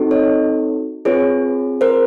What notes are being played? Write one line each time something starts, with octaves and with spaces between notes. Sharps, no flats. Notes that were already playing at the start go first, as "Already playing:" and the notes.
Already playing: C4 D#4 F#4 A4
C#5 D#5
C4 F4 G#4 B4 C#5
A#4 C5